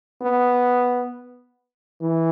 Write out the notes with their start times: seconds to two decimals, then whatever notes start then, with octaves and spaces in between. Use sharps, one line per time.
0.21 B3
2.01 E3